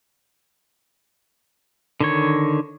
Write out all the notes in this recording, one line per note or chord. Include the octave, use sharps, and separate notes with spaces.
D3 D#3 C#5